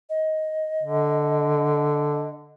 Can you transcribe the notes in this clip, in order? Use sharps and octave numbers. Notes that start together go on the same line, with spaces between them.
D#5
D3